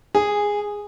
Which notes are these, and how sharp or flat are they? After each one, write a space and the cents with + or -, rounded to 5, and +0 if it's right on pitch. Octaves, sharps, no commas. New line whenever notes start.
G#4 -10